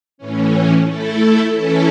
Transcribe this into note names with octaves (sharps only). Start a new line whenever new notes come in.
A2 E3 C#4
A3 E4 A4
E3 C#4 E4 A4